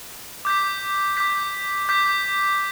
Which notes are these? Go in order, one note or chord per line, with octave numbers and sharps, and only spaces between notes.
D6 G6 B6
D6 G6 B6
D6 G6 B6